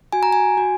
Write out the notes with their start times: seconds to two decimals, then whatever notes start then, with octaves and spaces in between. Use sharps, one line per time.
0.13 F#4 G#5
0.23 A#5
0.33 G#5
0.57 F#4